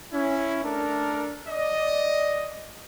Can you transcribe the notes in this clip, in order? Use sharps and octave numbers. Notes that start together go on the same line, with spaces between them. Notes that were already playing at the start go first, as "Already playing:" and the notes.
C#4 E4
A3 D4 A4 A#4
D5 D#5